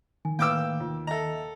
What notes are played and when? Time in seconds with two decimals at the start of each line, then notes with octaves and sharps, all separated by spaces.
0.25 D#3 G#5
0.39 A2 A#3 E4 B4 F5 G5 D6 E6
0.80 D#2 F4
1.07 A4 D#5 E5 A#5